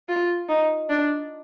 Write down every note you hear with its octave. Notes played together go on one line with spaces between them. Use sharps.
F4
D#4
D4